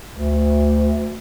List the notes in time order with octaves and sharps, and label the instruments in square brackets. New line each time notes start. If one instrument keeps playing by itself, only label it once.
[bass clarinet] D2